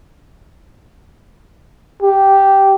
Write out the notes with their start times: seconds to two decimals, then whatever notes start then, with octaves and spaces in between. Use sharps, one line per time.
2.02 G4